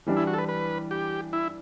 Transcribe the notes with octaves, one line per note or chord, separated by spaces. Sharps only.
E3 G3 D4
E4
F#4
A4
B4
B4
G4
E4